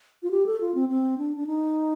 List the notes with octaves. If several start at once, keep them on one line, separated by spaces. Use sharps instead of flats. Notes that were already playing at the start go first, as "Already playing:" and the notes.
F4
G4
A4
F4
C4
C4
D4
D4
D#4